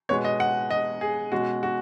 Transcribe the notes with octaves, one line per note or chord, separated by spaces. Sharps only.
B2 G#3 B3 C#5
D#5
F#5
D#5
G#4
B2 G#3 C#4 F#4
F#4